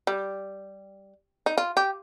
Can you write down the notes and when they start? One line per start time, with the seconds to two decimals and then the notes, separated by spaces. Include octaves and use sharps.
0.07 G3
1.46 D#4
1.58 F4
1.77 G4